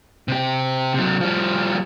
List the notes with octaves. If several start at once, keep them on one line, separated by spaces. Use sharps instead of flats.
C3 G4
C3 F#3
F3 G3